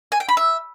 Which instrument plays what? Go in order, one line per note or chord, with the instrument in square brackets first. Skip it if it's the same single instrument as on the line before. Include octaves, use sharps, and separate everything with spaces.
[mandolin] G#5
G5
B5
E5